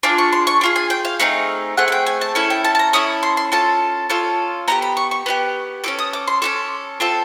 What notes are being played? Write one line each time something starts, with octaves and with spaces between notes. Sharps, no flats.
D4 F4 G#4 D6
C#6
C6
C#6
D4 F4 G#4
G#5
G5
F5
A3 C4 D#4 G#4
A3 C4 G#4 F#5
F#5
G5
G#5
A5
C#4 E4 A4 G#5
G5
A5
A5
A#5
C#4 E4 A4 D#6
C6
C6
C#4 F4 A4 A5
C#4 F4 A4
B3 D#4 G4 A#5
B5
C#6
C#6
B3 D#4 G4
C#4 F4 A4 D6
D#6
D6
C6
C#4 F4 A4 D6
C4 F4 A4